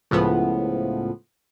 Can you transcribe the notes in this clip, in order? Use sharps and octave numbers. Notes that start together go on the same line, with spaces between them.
C#2 A2 F3 B3